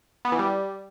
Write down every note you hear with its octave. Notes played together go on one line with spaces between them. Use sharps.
B3
E3
G3